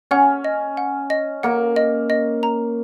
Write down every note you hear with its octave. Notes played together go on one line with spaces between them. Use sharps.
C#4 F#5
D#5
F#5
D#5
A#3 F#5
D#5
D#5
A#5